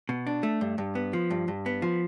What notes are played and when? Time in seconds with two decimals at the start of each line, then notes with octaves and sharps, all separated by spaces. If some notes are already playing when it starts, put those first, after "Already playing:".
0.09 B2
0.27 D4
0.43 A3
0.61 G2
0.78 G2
0.95 B3
1.13 F3
1.31 G2
1.48 G2
1.66 B3
1.82 F3